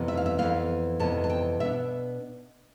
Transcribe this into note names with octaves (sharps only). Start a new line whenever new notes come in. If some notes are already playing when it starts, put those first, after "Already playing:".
Already playing: F2 C3 E3 B3
E5
F5
E5
F2 C3 E3 B3 F5
F2 C3 E3 B3 A5
A5
G5
B2 B3 D4 E5